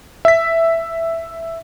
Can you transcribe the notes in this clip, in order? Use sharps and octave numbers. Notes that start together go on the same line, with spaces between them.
E5 B6